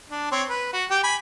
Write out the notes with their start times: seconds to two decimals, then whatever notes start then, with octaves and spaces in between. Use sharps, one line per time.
0.10 D4
0.32 C4 C#5
0.49 B4
0.73 F#4
0.91 G4 G5
1.03 G#5 B5